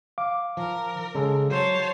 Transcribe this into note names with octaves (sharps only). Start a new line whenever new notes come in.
F5 D6
F3 A#4
C#3 G#3 A4
F#3 C5 C#5 A5